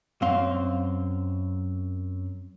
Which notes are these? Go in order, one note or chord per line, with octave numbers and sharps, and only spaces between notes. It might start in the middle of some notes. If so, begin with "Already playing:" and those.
F#2 C4 F5 C6